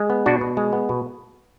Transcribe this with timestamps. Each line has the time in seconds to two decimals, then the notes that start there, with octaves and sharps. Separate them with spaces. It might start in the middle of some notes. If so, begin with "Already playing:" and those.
Already playing: G#3
0.10 B3
0.26 B2 D4 F#4
0.41 B2
0.57 G#3
0.73 B3
0.89 B2